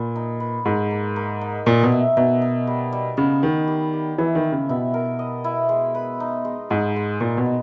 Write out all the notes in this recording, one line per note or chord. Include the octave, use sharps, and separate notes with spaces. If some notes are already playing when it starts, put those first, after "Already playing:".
Already playing: A#2 B4
D#4
B4
G#2 A#4
A#3
A#3
D#4
A#2 D#4
B2
E5
B2 D#4
D#4
G3
G3
C#3 B3
D#3 B3
G4
G4
E3 E4
D#3
E4
C#3
B2 E4
A#4
D#5
E4
G#3
B4
D#4
G#3
G#2 G#4
G#3
A#2 D#4
B2
D#4